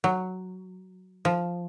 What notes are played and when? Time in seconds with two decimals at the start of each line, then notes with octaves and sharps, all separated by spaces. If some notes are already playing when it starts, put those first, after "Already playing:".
0.04 F#3
1.25 F3